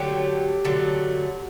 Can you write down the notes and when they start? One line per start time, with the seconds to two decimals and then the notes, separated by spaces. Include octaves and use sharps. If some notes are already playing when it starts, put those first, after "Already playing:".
Already playing: D3 F#3 A3 G4
0.64 D3 F#3 A3